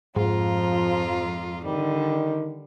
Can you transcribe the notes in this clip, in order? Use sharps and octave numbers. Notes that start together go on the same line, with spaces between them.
F2 G#2 F3 F4 A#5
D3 D#3 G3